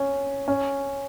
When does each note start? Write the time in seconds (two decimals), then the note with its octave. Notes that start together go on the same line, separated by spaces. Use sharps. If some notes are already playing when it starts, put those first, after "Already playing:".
Already playing: C#4
0.48 C#4